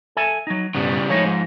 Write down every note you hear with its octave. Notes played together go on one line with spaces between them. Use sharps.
A4 E5 G#5
F#3 D#4
B1 G2 C#3 G3 B3
A2 F3 G#3 D#4 C#5
G#2